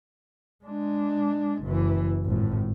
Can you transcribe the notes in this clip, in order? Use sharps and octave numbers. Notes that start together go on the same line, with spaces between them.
G#3 D4
F#1 E3
G#1 A2